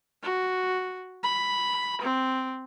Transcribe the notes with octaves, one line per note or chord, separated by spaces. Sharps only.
F#4
B5
C4